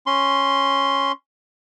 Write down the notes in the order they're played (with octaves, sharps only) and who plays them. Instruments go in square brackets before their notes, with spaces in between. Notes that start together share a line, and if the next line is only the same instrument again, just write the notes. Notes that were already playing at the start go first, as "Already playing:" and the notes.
[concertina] C#4 C6